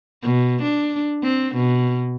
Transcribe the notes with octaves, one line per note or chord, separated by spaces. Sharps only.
B2
D4
C4
B2